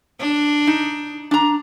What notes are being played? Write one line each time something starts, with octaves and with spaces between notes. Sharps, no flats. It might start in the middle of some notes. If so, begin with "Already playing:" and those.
D4
D#4
D4 A#5